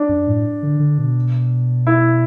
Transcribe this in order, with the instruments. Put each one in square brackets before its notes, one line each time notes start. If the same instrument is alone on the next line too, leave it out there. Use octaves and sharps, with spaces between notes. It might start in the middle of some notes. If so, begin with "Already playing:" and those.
Already playing: [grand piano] D4
[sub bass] F#2
A2
D3
D3
B2
[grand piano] E4